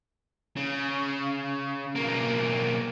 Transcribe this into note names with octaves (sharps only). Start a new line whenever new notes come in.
C#3
B1 A#3